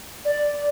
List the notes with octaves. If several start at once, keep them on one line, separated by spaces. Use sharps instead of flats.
D5